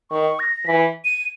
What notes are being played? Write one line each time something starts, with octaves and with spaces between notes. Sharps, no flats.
D#3 C#6
A#6
E3 B6
D#7